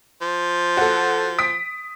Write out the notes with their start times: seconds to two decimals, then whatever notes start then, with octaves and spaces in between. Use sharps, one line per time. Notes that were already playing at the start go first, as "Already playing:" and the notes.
0.21 F3
0.77 F#4 A4
1.39 D#6 B6 D7